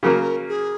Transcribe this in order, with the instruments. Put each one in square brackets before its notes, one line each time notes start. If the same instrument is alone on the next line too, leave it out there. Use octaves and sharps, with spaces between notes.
[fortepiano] C#3 F#3 A#3 [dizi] A#4
[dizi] G#4